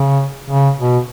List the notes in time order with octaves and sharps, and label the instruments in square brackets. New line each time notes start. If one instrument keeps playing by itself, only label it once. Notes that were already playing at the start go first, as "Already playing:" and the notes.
Already playing: [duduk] C#3
C#3
B2